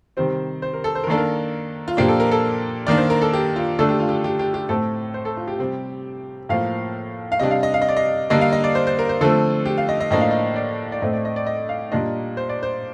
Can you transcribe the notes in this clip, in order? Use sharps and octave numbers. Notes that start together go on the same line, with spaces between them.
C3 D#3 G3 C4 C5
C5
A#4
A4
C5
A#4
D#3 A#3 D4 A4
A#4
F4
A#2 F3 A#3 D4 G4
A4
A#4
A4
D#3 A#3 D4 D5
C5
A#4
A4
G4
F4
D3 A3 D4 A4
G4
F4
G4
G4
G4
G4
A2 A3 C4 A4
C5
A4
F4
G4
C3 G3 C4
A2 F3 A#3 F5
F5
C3 G3 D4 D#5
F5
D#5
F5
D#5
D5
D#5
D3 G3 A#3 D4 D#5
F5
D#5
D5
C5
C5
A#4
C5
D3 F3 A3 C4 A4
G4
F5
D#5
D#5
A2 F3 A#3 D4 D#5
F5
D#5
D5
D5
A2 A3 C4 D#5
D5
D#5
D5
D#5
F5
A#2 G3 A#3 D4 D#5
C5
D5
C5